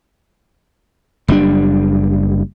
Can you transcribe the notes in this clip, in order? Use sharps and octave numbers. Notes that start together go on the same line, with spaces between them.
F#1 G3 C4 D4